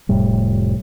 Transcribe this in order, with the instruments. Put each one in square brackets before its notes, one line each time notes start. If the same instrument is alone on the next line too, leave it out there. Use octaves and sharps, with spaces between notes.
[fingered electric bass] F1 F2 A2 G3